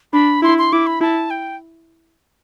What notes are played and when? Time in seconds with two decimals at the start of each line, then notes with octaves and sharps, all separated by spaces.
0.13 D4 B5
0.43 E4 C6
0.58 C6
0.73 E4 D6
0.87 B5
1.01 E4 A5
1.30 G5